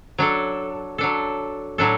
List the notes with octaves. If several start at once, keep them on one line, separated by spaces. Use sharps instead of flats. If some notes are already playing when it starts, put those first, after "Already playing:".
F#3 D4 A4
F#3 D4 A4
A2 F#3 D4 A4